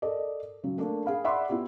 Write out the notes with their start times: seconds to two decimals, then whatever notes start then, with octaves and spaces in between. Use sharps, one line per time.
0.02 A4 A#4 D5 D#5
0.63 C#3 F#3
0.78 A3 A#3 D4
1.06 G#4 F5 B5
1.24 D5 E5 F#5 B5 C6 D6
1.49 B3 E4 F4 G4